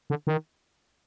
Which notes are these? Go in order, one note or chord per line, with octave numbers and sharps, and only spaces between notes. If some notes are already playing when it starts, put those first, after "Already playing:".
D3
D#3